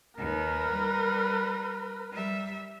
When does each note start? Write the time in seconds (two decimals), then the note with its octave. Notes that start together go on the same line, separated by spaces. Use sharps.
0.18 D#2 A#4 B4
0.71 G3
2.12 G3 E5